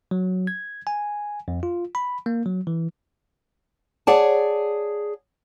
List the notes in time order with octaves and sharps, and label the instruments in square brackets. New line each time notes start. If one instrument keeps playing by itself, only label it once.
[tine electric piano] F#3
G#6
G#5
F2
F4
B5
A#3
F#3
E3
[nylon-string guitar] G#4 C#5 D5 F#5 A5